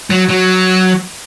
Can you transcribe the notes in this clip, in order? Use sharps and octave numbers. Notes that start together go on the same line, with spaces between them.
F#3
F#3